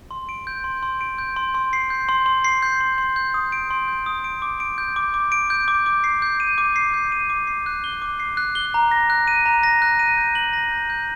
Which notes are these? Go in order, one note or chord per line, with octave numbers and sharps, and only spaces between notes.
C6
D7
G6
C6
C6
D7
G6
C6
C6
C7
G6
C6
C6
C7
G6
C6
C6
G6
D#6
D7
C6
G6
D#6
D7
D6
D7
G6
D6
D6
D7
G6
D6
D6
C7
G6
D#7
D6
C7
G6
D#7
D6
C7
F#6
G7
D6
C7
F#6
G7
A#5
A#6
F#6
D#7
A#5
A#6
F#6
D#7
G6
F#7
A#6
G6
G6